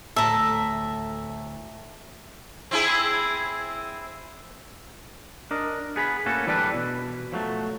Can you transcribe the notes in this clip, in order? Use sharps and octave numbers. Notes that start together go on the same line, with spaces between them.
D2 A2 E5 A5 A#5
C4 E4 G#4
D4 A#4 D#5
B3 G#4 A#5 B5
A2 A#3 C#4 F#4 A4
E3 G3 D4 A4 B4
B2
F3 F#3 A3